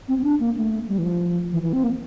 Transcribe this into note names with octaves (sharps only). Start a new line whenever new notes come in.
C4
C4
D4
A#3
A3
G3
E3
F3
E3
E3
C4
A#3